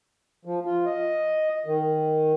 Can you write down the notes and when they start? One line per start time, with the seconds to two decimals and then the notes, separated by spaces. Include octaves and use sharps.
0.45 F3
0.66 F4
0.85 D#5
1.66 D#3